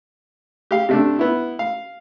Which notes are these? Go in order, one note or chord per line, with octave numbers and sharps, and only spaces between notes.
G4 F5
C3 A3 D4
B3 E4
F5